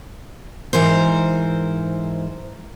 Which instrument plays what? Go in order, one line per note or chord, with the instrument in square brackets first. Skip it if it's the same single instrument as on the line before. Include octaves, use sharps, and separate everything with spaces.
[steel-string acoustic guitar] G#2 E3 A#4 C5